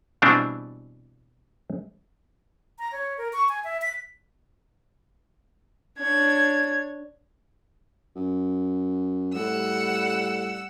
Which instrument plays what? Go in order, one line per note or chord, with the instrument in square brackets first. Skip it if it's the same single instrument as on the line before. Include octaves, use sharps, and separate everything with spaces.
[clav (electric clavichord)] B2 E3 G3 C4 D4 E4
[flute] A#5
C#5
A#4
C#6
G#5
E5
B6
[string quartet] D4 C#5 G#6
[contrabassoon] F#2
[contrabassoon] A2 [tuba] G3 [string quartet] F#5 E6